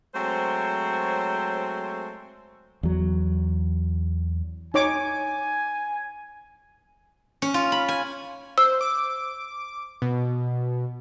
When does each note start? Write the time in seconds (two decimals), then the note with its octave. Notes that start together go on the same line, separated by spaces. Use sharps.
0.14 F#3 G#3 A3 C4 C5 C#5
2.83 E2 F#3
4.74 D#4 C#5 G#5 D6
7.42 C#4
7.54 F4
7.72 B5
7.88 G#5
8.58 C5 E6
8.81 D6
10.02 B2